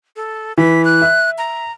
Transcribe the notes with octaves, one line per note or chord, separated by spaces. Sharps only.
A4
E3 B6
F#6
E5
A#5